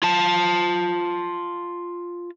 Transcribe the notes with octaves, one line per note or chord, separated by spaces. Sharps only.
F4 A5